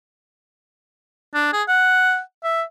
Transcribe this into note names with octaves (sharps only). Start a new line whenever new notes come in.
D4
G#4
F#5
E5